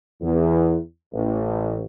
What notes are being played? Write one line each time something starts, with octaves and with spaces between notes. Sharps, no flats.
E2
A1